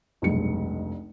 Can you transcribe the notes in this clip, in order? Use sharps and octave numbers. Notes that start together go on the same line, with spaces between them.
F1 B1 G2 G#3 C#7